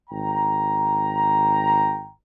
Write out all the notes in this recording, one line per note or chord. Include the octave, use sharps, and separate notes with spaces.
G#1 G5 A#5